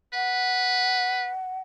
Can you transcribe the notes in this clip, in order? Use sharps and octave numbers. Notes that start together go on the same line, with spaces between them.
B4 F#5